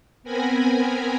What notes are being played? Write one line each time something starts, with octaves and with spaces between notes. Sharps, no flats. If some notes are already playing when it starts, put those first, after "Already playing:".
B3 C4 A#4 G#5 A#5 B5